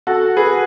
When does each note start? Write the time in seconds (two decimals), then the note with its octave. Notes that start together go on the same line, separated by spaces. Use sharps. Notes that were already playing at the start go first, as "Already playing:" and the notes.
0.07 F#4 A4
0.37 G#4 B4